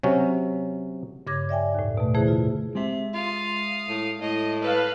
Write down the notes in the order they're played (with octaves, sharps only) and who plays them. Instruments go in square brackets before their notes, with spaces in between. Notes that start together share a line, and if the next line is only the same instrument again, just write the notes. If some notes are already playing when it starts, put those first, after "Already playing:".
[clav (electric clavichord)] C3 F#3 C#4
[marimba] G2 C#3 C#5 D6 G#6 A#6
D5 E5 G5 G#5
D#2 A2
B2 A3
D3 E3 A3 E4 G#4 C5
F4
[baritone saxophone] C3 [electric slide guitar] G#3 E5
[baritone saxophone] F4 [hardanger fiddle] F5 D#6
[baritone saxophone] A2
[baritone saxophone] A2 [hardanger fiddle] D#5
[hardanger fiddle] A4 D#5 [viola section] B4 F5